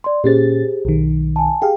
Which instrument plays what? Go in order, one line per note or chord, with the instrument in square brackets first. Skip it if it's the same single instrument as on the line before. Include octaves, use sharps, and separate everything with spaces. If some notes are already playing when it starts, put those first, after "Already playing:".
[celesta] D5 C6
[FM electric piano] A#2 C#4 A6 [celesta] G4 G#4 C5
[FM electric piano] B1 D#3
[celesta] G#5 A5
[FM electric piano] G4 G#4 F5 [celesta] G5